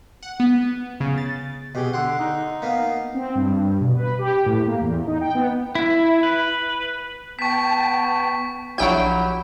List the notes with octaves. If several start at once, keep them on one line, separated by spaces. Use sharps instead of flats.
F#5
B3
C#3
A6
B2 G4 G#4
D3 F#5 C6 D6
D#4
A#3 B3 F5
C4
G2
B2
B4
G4
A2
A#3
E2
D#4
G5
B3
E4
B4
B3 G5 A5 C#6 B6
A#1 F#3 E4 G4 G5 G6